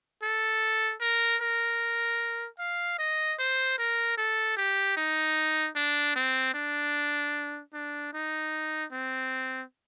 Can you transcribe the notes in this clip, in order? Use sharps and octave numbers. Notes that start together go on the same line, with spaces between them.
A4
A#4
A#4
F5
D#5
C5
A#4
A4
G4
D#4
D4
C4
D4
D4
D#4
C4